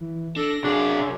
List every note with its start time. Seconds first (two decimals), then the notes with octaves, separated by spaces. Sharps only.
0.01 E3
0.36 D4 A4 A#6
0.64 F#2 C3 D4 G#4 F5